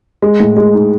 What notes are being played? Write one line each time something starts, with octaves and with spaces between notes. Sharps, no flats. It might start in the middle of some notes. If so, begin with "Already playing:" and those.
G#3
A2
G#3
D#4